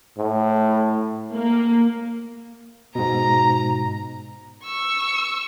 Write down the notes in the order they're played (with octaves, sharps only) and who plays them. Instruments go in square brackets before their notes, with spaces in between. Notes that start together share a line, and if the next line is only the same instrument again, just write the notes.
[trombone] A2
[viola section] A#3
[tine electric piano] G#2 B2 [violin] A#5
[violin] C#6 E6